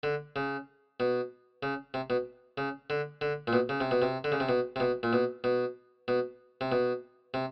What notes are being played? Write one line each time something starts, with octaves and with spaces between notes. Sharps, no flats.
D3
C#3
B2
C#3
C3
B2
C#3
D3
D3
A#2
B2
C#3
C3
B2
C3
D3
C#3
C3
B2
C3
B2
A#2
B2
B2
B2
C3
B2
C3